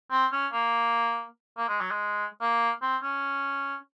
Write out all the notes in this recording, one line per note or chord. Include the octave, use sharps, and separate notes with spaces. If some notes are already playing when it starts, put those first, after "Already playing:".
C4
C#4
A#3
A#3
G#3
F#3
G#3
A#3
C4
C#4